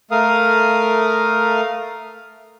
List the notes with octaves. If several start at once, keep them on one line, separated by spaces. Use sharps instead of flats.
A3 A#4 F5 D#6